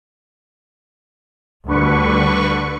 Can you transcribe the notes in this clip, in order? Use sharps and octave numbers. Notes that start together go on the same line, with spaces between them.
D2 D3 D#3 G3 B4 C#6